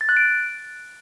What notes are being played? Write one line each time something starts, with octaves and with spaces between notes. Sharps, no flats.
A6
F#6
D7